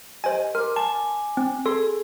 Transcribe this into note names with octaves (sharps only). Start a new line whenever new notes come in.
G4 C5 D#5 G#5
A#4 C6 D6
G#5 A5 D6
C4
G#4 A4 C6